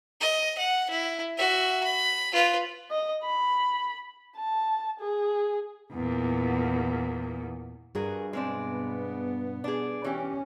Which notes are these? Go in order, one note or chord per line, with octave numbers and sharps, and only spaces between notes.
D#5
F#5
E4
F#4 E5
B5
F4 B4
D#5
B5
A5
G#4
E2 A#2
G2 F#4 G#4 A#4
B2 G#3 B3 C4 D4
D4 G#4
E3 C#4 G4